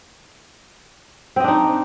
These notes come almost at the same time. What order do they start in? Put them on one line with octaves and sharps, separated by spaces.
C4 D#5 D4 D#4